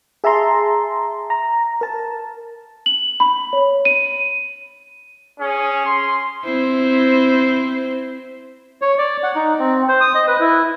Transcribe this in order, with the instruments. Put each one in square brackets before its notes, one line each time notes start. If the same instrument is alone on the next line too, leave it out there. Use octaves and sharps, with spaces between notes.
[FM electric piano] G#4 E5 A5 A#5 C6
A#5
A#4 A5
[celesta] F#7
B5
C#5
D#7
[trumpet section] C#4 G#4
C6
[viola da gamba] C4 E4 C5
[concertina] C#5
D5
F#5
D#4
C4
C5
D#6
D#5
B4
E4